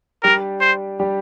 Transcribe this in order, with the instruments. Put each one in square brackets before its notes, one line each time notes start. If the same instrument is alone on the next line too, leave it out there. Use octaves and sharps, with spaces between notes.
[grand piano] G3 D4 G4 [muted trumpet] A#4
[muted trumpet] C5
[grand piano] G3 D4 G4